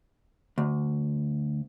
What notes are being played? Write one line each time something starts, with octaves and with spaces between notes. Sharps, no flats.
D2